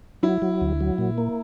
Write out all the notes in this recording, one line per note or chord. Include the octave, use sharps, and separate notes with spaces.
F#3 E4
F#3
D2
F#3
A#2
A#3